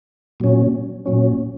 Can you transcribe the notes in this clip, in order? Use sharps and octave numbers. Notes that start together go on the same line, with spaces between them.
A#2 F#3 C#4
A#2 F#3 C#4